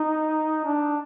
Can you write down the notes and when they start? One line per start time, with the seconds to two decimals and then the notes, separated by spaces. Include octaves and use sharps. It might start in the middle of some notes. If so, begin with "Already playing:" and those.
Already playing: D#4
0.65 D4